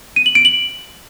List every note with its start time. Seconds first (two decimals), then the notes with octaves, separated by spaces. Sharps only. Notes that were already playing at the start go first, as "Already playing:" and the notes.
0.16 D#7
0.26 F#7
0.35 D7
0.45 F#7